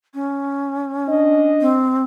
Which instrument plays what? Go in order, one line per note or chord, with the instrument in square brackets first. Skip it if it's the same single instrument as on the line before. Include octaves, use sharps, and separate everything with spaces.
[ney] C#4
[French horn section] D4 D#5
[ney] C4